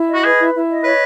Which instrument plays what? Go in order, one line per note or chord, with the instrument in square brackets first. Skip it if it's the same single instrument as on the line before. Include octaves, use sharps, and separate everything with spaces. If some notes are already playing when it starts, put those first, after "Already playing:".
Already playing: [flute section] E4
D#5
[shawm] F#4
[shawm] G#4 [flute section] B4
[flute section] E4
E4
D#5
[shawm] B4 [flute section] C#5